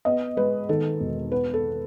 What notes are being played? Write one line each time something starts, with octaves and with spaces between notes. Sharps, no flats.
B3 D#5
G#3 B4
D#3 A4
E1
B3 B4
A4